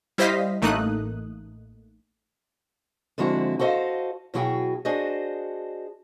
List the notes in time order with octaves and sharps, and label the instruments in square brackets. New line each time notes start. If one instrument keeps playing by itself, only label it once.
[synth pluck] G3 E4 C5 D#5 F5 B6
A1 A3 A#3 D#4 D#6 F#6
[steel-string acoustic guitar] D3 F3 G#3 C4 E4 F#4
F#4 A4 C5 D#5 F5
B2 F#3 E4 F#4 G#4 G5
D4 F#4 G#4 C5 D#5